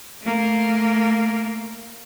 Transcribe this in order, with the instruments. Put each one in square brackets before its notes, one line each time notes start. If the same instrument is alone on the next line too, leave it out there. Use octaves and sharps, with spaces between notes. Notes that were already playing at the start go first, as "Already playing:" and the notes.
[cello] A3 A#3